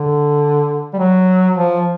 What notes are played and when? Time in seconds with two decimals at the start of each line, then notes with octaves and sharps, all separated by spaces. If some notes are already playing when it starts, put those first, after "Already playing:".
Already playing: D3
0.94 G3
0.99 F#3
1.55 F3